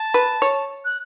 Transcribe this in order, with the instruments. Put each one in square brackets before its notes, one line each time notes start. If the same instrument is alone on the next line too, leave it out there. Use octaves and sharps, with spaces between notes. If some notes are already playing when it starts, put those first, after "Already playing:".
Already playing: [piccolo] A5
[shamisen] B4
C#5
[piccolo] F#6